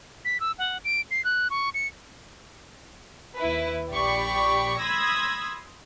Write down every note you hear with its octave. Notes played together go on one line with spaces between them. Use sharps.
B6
E6
F#5
D7
C7
F#6
C#6
C#7
D#2 E4 B4
A#1 G4 D5 B5 C#6
B5 C6 D#6 E6 G#6 A#6